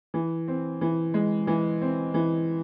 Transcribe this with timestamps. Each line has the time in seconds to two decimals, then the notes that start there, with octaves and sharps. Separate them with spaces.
0.14 E3
0.48 C4
0.81 E3
1.14 G#3
1.47 E3
1.82 C4
2.14 E3